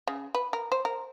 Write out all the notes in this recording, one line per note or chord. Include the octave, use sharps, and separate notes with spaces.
C#3
B4
A#4
C5
A#4